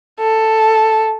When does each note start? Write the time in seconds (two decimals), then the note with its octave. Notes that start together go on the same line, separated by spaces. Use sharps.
0.20 A4